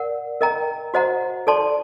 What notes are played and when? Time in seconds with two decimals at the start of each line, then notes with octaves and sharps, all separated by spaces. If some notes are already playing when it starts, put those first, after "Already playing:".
Already playing: A#4 D5 F#5
0.41 A#4 D#5 G5 A#5
0.94 F#4 C5 D#5 F#5 A#5
1.47 A4 D5 A5 C6